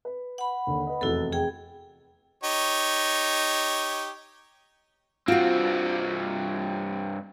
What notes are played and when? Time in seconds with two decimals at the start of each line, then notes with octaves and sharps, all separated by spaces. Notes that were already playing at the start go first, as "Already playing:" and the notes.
0.05 B4
0.38 F#5 B5
0.67 D#2 D3
0.87 B4 D#5
1.01 F1 E2 E4 F#4 A4
1.32 G#4 G5
2.44 D#4 G4 C#5
5.28 G2 C4 F4 F#4